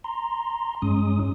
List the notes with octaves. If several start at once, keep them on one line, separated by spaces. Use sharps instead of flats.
A#5 C6
G2 G#3 C#4 D#6